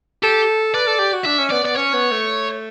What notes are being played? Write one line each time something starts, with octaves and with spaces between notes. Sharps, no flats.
G4 A4
B4 D5
A4
G4
F#4
D4 E5
C#4
B3 D5
B3 D5
C#4 C#5
B3
A3